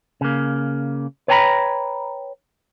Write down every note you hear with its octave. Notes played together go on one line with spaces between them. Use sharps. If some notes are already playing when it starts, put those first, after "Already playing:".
C#3 A#3
B4 C#5 G5 G#5 A#5 B5